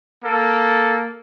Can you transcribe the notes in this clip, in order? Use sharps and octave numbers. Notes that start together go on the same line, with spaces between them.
A#3 A4